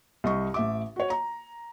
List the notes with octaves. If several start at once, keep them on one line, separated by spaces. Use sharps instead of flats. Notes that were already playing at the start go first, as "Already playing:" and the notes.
C2 D#5 C#6
A1 E5 D6
F#4 C#5
A#5